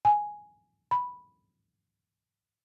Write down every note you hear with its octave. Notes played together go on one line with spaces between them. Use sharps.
G#5
B5